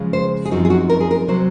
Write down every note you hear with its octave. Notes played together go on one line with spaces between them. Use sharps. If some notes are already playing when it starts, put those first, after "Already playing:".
Already playing: C#3 F3 G#3
C5
G#4
F#2 F3 C4 D#4 F#4
G#4
F#4
A#4
G#4
A#4
C3 F#3 C4 C5